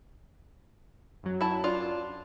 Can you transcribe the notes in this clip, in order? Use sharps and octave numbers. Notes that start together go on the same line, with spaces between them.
F#2 F#3
E4 A5
D4 F4